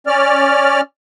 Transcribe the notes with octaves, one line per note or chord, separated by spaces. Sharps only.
C#4 D5 F6